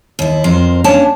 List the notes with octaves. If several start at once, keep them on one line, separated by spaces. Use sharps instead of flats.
D#2 E4
F2 A#4 C5
A#3 C#4 D4 C#5 A5